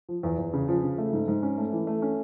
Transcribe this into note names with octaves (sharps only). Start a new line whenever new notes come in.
F3
E2
E2
C#3
F3
C#3
A3
G#2
G#2
C#4
A3
E3
A3
C#4